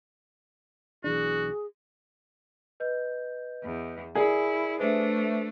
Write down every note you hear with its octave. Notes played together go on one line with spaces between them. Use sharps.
B1 E3 D4 F#4 G#4
B4 D#5 G6
E2
E4 G#4 A#4 D5
A3 D4 B4 C5 E5